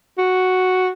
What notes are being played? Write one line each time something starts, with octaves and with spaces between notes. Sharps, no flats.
F#4